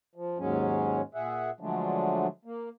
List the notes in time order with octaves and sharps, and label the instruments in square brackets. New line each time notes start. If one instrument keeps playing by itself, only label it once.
[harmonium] F3
D#2 G#2 F#3 G#3 C#4
A#2 G#4 E5 F#5
D3 F3 F#3 G#3 A3 D4
A#3